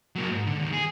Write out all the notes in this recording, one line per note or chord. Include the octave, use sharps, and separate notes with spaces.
F#3 A#3
G#2
D3
D#2
G#4